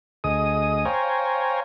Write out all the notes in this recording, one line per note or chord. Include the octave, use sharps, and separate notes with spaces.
D2 G#4 D#5 D#6
C5 C#5 F5 G5 G#5 A#5